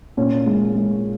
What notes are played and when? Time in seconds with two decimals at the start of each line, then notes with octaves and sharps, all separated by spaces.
0.17 A#2 C#4
0.46 G#3
0.75 G#3